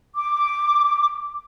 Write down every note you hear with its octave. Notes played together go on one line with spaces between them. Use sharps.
D6